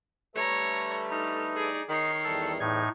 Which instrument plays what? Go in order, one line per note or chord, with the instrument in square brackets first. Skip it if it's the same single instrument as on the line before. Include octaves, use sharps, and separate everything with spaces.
[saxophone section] D3 G3 A3 [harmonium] A4 B4 E5 [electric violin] C#5 A#5
[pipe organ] D#4 [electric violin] F6
[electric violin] G#4 D5
[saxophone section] D#3 [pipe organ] D#4 [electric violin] C#5 C7
[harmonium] E2 E3 G3 [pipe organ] A4
[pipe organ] A2 D#4 G#6